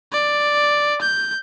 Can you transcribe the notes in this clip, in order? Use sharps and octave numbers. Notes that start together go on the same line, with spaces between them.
D5
G6